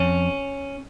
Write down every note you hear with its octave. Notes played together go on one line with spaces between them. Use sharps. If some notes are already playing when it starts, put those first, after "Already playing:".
Already playing: F2 C#4